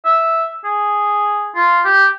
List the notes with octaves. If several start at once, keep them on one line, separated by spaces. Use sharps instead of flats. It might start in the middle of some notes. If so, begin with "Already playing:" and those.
E5
G#4
F4
G4